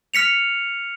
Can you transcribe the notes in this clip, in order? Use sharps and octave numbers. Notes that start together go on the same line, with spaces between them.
F6 B6 C#7 F7